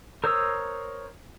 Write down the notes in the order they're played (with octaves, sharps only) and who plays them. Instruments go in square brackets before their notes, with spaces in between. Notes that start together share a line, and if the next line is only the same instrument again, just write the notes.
[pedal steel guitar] A#4 C5 C#5 D#6 E6